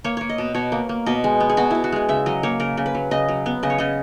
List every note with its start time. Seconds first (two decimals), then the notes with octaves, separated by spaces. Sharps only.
0.04 A#3 C#5
0.17 A#3 C#5
0.29 D#5
0.38 B2
0.54 B2 C#5
0.72 A#3
0.89 A#3
1.06 B2 D#5
1.24 G#3
1.40 B3
1.49 G#4
1.57 B2 F#4
1.71 B2 E4
1.84 F#4
1.92 G#3 G#4
2.09 C#3 E5
2.26 F#3 D#5
2.43 A#3 C#5
2.60 C#3 A#4
2.77 C#3
2.86 B4
2.95 F#3
3.11 C#3 D#5
3.28 F#3
3.46 B3
3.63 C#3 D#5
3.70 C#5
3.78 C#3 D#5